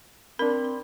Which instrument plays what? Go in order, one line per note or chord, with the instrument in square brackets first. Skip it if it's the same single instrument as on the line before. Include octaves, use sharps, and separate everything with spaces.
[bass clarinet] C4 [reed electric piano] D4 B5 [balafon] A#4